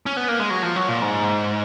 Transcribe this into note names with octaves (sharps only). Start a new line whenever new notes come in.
C#4
B3
A#3
G#3
F#3
F3
F#3
A#2
G#2